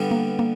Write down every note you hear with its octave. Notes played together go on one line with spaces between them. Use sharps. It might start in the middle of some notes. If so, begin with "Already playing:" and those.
Already playing: G2 D3 G3 B3
A#3
A#3